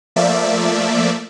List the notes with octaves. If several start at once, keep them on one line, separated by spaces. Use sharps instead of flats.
F3 A3 A#3 D5 E5